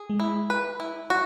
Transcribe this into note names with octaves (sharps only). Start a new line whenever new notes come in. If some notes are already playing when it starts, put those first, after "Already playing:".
Already playing: G#4
G#3
E4
B4
E4
F#4